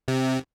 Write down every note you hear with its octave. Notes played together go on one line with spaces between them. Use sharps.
C3